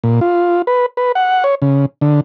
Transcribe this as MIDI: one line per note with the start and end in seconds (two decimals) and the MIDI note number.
0.04 0.20 46
0.21 0.62 65
0.67 0.86 71
0.97 1.12 71
1.15 1.44 78
1.44 1.55 73
1.62 1.86 49
2.01 2.20 50